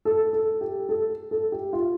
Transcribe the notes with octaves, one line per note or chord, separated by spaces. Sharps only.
A4
A4
G4
A4
A4
G4
F4